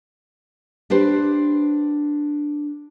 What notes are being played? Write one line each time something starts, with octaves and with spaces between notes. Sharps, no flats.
D4 G4 B4 C5